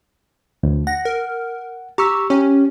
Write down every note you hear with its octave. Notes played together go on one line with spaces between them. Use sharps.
D2
F#5 A#6
A#4
G4 A#5 C#6 E6
C#4 G4 C#5